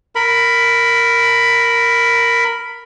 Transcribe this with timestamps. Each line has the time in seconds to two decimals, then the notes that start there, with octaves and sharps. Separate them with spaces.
0.15 A#4 B5